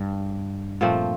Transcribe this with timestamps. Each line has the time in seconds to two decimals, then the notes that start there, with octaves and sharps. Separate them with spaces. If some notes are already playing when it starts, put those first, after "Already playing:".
Already playing: G2
0.81 A#2 F3 A3 C4